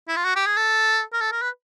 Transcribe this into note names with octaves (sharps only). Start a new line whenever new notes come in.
E4
F4
F#4
G4
G#4
A4
A#4
A4
A#4
B4